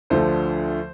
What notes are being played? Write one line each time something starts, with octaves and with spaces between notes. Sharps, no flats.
D2 D3 F3 A3 C5